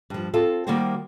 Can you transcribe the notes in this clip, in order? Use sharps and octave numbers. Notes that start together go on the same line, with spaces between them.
G2 F3
C4 F4 A4
D#3 G3 A#3 F#4 G4 C5